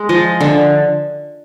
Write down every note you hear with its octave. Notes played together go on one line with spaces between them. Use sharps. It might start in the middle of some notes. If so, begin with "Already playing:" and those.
Already playing: G#3
F3 D#5
D3 E5